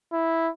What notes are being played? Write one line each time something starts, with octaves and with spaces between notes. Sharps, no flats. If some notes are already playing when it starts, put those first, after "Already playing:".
E4